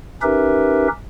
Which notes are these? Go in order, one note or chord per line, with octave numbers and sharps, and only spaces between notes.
C#4 D#4 G4 A#4 B4 E5